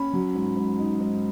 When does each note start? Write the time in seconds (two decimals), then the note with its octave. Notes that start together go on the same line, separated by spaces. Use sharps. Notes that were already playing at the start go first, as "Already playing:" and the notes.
Already playing: C#4 B5
0.13 F#3
0.35 G#2
0.57 G#2
0.79 D#4
1.00 G#2